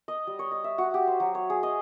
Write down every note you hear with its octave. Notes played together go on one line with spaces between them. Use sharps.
D#5
G3
C#5
D#5
E5
F#4
G4
C5
F#3
C#5
G#4
D#5